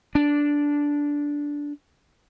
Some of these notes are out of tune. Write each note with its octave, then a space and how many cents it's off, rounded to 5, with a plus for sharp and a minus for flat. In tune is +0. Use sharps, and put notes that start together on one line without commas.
D4 -10